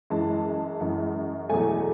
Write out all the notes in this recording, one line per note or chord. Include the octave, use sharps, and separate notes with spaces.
F#2 E3 G#3 A5
F#2 E3 G#3
E2 B2 F#3 A3 G#5